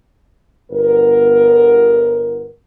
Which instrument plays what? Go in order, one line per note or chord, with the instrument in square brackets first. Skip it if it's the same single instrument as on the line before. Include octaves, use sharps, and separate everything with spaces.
[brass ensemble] G1 B3 A#4